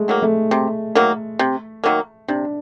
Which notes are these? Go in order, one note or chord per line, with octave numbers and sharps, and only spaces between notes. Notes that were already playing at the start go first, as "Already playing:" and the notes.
Already playing: G#3 A3
D#3 F#3 A#3
A3
C3
D#3 F#3 A#3
C3
D#3 F#3 A#3
C3 D4